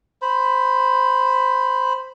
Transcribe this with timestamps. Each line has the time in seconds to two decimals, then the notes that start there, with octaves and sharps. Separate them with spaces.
0.22 C5 B5